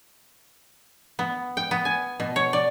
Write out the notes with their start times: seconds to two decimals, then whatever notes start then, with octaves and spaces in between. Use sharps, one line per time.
1.19 B3
1.57 G5
1.71 B3
1.85 G#5
2.20 B2
2.36 C#5
2.53 D5